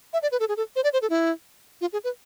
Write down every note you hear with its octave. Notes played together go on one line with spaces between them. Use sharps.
E5
D5
B4
A4
G#4
A4
C5
D5
C5
A4
E4
F4
G#4
B4